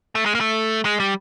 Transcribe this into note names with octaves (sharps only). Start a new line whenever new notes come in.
A3
G#3
A#3
A3
G#3
G3